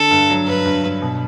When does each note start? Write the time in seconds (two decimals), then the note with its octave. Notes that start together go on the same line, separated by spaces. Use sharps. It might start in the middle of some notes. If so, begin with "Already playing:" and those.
Already playing: D3 A4
0.11 G2
0.30 F#3
0.47 G2 B4
0.65 G2
0.84 G2
1.02 B2